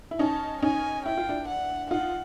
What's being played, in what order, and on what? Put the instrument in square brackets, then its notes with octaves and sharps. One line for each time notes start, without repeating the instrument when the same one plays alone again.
[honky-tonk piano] E4
[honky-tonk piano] C#4 D#4 [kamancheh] A5
[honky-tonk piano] C#4 D#4 [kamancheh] G#5
[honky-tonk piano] E4 [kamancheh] G5
[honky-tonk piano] F4
D4 E4
[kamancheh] F#5
[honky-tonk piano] D#4 F4 [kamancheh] F#5